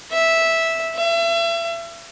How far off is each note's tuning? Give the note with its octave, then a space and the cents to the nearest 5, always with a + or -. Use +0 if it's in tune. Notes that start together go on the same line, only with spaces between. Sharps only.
E5 -5
E5 +35